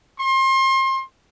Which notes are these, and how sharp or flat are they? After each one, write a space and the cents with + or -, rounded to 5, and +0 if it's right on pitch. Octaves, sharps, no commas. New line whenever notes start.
C6 +35